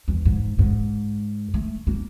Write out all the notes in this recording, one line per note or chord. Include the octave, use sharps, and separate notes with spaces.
E2
G#2
G#2
A3
A#3